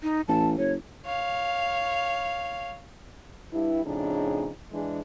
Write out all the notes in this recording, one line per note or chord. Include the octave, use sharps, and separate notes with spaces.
D#4
A1 A5
F#1 C#5
C#5 F5
G2 E4
F2 A2 C#3 D4 D#4 G#4
E3 G#3 D4 G#4